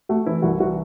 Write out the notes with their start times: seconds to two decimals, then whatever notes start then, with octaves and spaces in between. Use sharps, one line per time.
0.09 A3 F#4
0.26 E3 E4
0.42 C2 F#4
0.60 E3 F#4